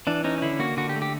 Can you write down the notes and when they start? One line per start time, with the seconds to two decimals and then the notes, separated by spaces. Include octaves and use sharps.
0.07 E3 D4
0.24 C#4 D#4
0.38 D#4
0.42 D3 E4
0.59 A#3 F#4
0.77 D3 F#4
0.89 G4
0.96 A3
1.02 G4